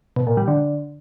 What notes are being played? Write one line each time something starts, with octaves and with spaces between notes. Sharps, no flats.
B2
A#2
G3
D3